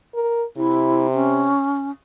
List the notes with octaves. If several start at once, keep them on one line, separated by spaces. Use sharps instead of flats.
A#4
C3 E4
C#4